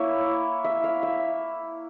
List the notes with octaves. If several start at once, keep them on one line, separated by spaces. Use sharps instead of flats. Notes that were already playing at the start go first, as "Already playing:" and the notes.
Already playing: A#3 E4 C#5 E5
E5
F5
E5